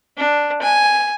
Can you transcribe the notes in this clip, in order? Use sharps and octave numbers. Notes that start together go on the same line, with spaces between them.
D4
G#5